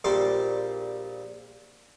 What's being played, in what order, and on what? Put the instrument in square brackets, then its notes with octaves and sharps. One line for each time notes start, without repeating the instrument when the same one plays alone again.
[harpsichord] A#1 A#2 G3 C5 G5 A5